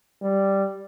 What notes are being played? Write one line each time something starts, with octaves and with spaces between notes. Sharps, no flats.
G3